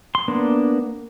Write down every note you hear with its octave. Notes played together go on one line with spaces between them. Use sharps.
C6
A#3 B3 D4